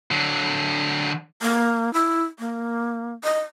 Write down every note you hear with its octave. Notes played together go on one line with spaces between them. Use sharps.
D3 F#3
A#3
E4
A#3
D#5